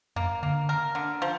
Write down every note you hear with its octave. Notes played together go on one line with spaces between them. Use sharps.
F#2 A#3
D3 A#3
A#4
D3
F3